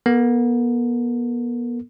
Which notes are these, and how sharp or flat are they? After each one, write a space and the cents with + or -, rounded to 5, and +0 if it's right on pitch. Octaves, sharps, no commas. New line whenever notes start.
B3 -40 A4 +40